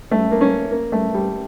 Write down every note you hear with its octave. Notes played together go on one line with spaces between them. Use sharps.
A3
A#3
C#4
A#3
A3
G3